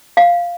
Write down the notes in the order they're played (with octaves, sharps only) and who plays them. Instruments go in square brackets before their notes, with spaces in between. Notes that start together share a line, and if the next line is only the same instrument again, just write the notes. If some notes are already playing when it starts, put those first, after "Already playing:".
[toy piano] F5